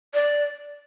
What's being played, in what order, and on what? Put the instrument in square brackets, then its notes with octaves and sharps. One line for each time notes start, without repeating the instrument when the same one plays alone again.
[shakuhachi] D5